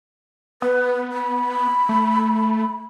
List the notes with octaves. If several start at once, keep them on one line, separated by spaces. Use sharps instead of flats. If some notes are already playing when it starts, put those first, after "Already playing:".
B3 B4
B5
A3